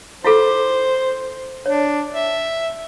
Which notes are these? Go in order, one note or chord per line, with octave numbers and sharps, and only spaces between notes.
E4 F4 A4 C5
D4 C#5
E5